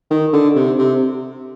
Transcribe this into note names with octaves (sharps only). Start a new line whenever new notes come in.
D#3
D3
C3
C3